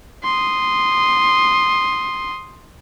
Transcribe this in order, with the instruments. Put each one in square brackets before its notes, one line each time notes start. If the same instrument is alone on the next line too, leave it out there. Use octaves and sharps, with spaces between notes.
[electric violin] C6 D#6